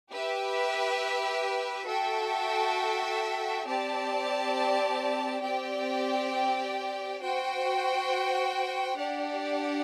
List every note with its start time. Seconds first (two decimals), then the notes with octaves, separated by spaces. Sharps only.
0.11 G4 B4 E5
1.87 F#4 A4 E5 G5
3.66 C4 G4 D5 A5
5.42 C4 G4 D5 G5
7.21 F#4 C5 G5
8.98 D4 G4 D5 F#5